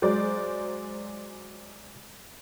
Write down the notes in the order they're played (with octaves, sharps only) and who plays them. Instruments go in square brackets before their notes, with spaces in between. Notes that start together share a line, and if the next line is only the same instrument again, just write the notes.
[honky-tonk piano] F#3 G#3 C5 D5